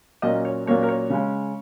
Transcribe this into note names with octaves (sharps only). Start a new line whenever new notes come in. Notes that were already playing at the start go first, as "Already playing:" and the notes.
A#2 F#3 A#3 C#4 D#5
C#5
A#2 F#3 A#3 C#4 C#5
A#4
C#5
C#3 G#3 C#4